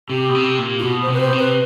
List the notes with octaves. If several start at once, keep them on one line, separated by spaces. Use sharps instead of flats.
C3 G4
B2
C3
A#2
F4
B2 F#4
C5
C3
B4
C5
B2
C3
B4